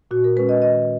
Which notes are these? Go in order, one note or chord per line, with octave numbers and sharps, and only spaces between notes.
A#2 F#4
A#4
G#3 C#4 B4
D#5
D#3 D#5